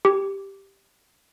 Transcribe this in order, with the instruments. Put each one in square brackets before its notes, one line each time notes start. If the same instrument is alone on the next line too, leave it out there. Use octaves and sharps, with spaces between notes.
[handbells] G4